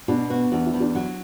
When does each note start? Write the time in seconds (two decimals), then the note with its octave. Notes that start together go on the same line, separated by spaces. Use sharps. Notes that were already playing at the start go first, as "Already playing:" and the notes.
0.08 B2 D4
0.30 B3 F#4
0.52 E2 D4
0.66 E4
0.74 E2
0.80 D4
0.95 F#3 F#4